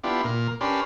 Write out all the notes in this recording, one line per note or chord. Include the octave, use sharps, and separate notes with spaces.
B3 D4 E4 F4 G4
A#2 A#4
C#4 D4 G4 A#4 B4 C6